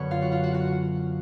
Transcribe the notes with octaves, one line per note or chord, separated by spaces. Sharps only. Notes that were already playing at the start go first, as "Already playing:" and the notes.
Already playing: F#2 D3 F#3 B3 C#4 B4 C#5
F4 F5
F#4 F#5
F4 F5
F#4 F#5
F#4 F#5